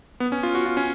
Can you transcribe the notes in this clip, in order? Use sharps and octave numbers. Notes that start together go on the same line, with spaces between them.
B3
C#4
F4
F#4
F4
C#4